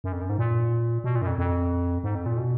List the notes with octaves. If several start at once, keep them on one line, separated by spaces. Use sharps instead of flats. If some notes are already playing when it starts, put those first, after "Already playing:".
F#2
F2
F#2
G#2
A#2
B2
A#2
F#2
F2
F2
G#2
F2
A#2
B2